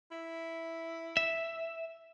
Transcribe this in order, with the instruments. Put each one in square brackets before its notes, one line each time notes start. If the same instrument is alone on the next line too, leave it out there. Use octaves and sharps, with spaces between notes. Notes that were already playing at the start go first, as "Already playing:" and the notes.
[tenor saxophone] E4
[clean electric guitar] E5